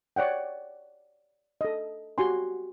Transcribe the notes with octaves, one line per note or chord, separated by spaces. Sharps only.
C#5 D5 F#5 G5
A4 D#5
F#4 G4 G#5 C6